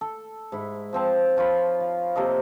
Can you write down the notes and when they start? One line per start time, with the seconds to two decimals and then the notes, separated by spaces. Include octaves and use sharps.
0.01 A4
0.52 G#2 E4
0.93 F3 C4 A5
1.37 F3 F4 C#5 B5
1.80 F5
2.16 C3 A#3 A4 D#5